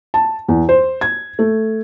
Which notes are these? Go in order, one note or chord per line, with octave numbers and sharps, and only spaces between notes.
A5
E2
C5
G#6
A3